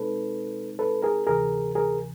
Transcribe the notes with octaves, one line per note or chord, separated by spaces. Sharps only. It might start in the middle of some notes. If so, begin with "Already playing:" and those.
Already playing: B2 G#3 C4 D#4 A4 B4
A4 B4
G#4 A#4
D2 C3 E3 G#4 A#4
G#4 A#4